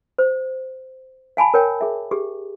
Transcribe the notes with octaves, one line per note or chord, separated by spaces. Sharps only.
C5
F5 G#5 A5 B5
A#4 C#5 G5
G#4 E5
G4 G#4